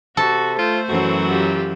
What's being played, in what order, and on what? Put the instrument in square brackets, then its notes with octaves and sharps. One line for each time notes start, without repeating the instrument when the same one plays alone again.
[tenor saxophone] C3 [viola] F#4 [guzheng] A4
[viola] A3 C5 [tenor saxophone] F4
[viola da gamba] F#2 E3 F#3 [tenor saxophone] F#4
[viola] F4 G4